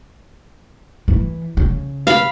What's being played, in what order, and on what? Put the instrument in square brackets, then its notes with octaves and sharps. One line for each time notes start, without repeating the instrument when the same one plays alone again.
[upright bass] E3
C#3
[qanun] F5 B5